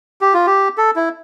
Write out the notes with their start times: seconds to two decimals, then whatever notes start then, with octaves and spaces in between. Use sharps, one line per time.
0.21 G4
0.34 F4
0.47 G4
0.77 A4
0.96 E4